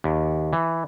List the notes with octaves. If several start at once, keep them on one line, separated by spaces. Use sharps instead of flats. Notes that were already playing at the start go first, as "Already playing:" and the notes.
D#2
E3